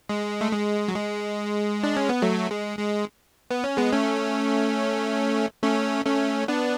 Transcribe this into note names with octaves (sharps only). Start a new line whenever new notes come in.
G#3
A3
G#3
F#3
G#3
D4
C#4
B3
F#3 A3
G#3
G#3
B3
C#4
G#3 B3
A3 C#4
A3 C#4
A3 C#4
B3 D4